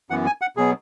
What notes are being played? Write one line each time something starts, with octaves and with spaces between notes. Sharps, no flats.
F#2 E3 B3 F#5
G#5
F#5
B2 F#3 B3 G#4